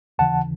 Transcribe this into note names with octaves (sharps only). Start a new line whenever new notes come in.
D#2 C#3 E3 F#5 A5